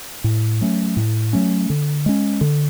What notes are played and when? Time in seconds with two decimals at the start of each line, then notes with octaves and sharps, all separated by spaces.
0.24 A2
0.61 F#3 A3 C#4
0.97 A2
1.33 F#3 A3 C#4
1.70 D3
2.06 G#3 C#4
2.41 D3